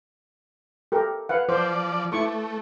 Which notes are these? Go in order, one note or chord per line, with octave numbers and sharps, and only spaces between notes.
G4 A4 A#4
B4 F5 F#5
F3 C5 D5
A3 E4 C#6 D6